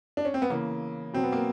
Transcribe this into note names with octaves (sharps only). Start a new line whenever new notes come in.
D4
C#4
C4
B3
C#3 E3 A#3
B2 F#3 C4
B3
A#3